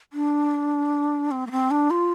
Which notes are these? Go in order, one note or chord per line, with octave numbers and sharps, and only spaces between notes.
D4
C4
A#3
C4
D4
F4